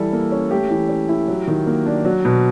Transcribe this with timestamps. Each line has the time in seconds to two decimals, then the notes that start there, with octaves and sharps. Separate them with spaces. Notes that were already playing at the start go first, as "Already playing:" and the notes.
Already playing: E3 G3 A4
0.12 A#3
0.32 C#4
0.51 A3 G4
0.70 E3
0.89 C#4
1.09 E4
1.28 F#3
1.47 D#3
1.67 A#3
1.86 D4
2.05 F#3
2.25 B2